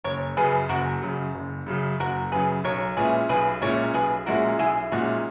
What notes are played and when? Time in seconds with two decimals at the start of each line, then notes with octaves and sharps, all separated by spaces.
0.04 F#1 A#4 C#5
0.37 F#2 C#3 F#3 G#4 B4
0.69 F#1 F#4 A#4
1.02 F#2 C#3 F#3
1.34 F#1
1.66 F#2 C#3 F#3
2.00 F#1 F#4 A#4
2.32 F#2 C#3 F#3 G#4 B4
2.64 B1 A#4 C#5
2.97 A#2 G#3 C#4 E4 G#4 B4
3.29 B1 G#4 B4
3.61 A#2 G#3 C#4 E4 A#4 C#5
3.94 B1 G#4 B4
4.26 A#2 G#3 C#4 E4 F#4 A#4
4.59 B1 E4 G#4
4.92 A#2 G#3 C#4 D#4 E4 F#4